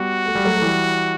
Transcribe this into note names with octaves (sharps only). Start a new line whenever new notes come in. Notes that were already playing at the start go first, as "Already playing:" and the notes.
Already playing: G3 B3 F#4
A3
G3
F#3 A3
A3
E3 G3